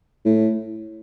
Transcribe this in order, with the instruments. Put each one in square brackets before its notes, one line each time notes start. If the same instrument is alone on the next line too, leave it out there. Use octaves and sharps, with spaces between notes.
[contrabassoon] A2